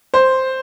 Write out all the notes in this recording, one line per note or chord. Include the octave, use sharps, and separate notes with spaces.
C5